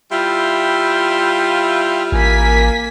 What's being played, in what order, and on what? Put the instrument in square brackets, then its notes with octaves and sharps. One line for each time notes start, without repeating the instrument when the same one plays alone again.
[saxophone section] G3 E4 F4 [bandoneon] E5 G5 C6
[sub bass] A1 [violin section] A#3 G#5 B6